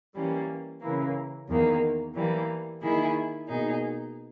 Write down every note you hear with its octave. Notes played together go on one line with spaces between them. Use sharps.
E3 G3 A#3 C#4
C#3 E3 A#3
E2 D#3 A#3
E3 G3 A#3
D#3 A#3 E4 G#4
B2 A#3 D#4 G#4